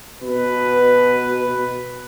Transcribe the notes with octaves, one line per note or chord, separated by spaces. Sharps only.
B2 B4